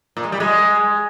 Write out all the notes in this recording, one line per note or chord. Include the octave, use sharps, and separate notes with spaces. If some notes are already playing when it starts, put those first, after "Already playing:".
A#2
G#3
G3
G#3